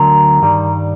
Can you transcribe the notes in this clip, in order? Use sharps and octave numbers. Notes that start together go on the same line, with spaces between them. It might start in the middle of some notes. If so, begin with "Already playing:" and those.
Already playing: D2 D3 F#3 A#4
G2 D#3 G3